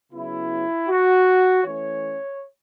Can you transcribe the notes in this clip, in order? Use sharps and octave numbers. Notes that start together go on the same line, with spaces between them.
C#3 F#3 B3 E4
F#4
E3 A3 C#4 C#5